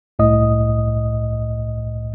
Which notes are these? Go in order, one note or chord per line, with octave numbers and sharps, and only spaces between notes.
C2 A2 D#5 D#6